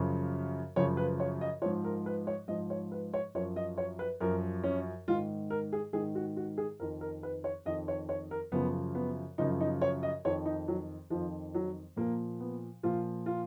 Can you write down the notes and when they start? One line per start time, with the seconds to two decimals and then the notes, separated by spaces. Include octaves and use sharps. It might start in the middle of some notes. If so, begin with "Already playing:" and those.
Already playing: F#2 C#3 F3
0.76 F#2 C#3 F3 C#5
0.97 B4
1.20 C#5
1.41 D#5
1.62 G#2 F3 C#5
1.84 A#4
2.06 B4
2.27 C#5
2.48 G#2 F3 D#5
2.70 C#5
2.92 B4
3.14 C#5
3.35 F#2 F3 C#5
3.56 D#5
3.78 C#5
3.99 B4
4.21 F#2 F3 A#4
4.64 C#4
5.08 G#2 D#3 F4
5.50 A#4
5.73 G#4
5.93 G#2 D#3 G#4
6.15 F#4
6.37 F#4
6.58 G#4
6.80 F2 D#3 A#4
7.01 A#4
7.23 B4
7.44 C#5
7.66 F2 D#3 D#5
7.88 C#5
8.09 C#5
8.31 A#4
8.52 F#2 C#3 F3 B3
8.95 B3
9.38 F#2 C#3 F3 D#4
9.61 D#4
9.82 C#5
10.03 D#5
10.25 F2 D#3 C#5
10.46 D#4
10.68 F#3
11.10 F2 D#3 F3
11.55 F#3
11.96 A#2 F3 A#3
12.40 B3
12.83 A#2 F3 F4
13.26 F4